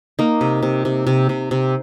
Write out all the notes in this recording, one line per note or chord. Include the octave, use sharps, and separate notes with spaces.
A#3 D#4
C3
C3
C3
C3
C3
C3